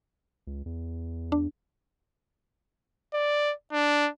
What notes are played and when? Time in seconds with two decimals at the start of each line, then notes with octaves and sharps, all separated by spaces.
0.47 C#2
0.66 E2
1.32 D4
3.14 D5
3.72 D4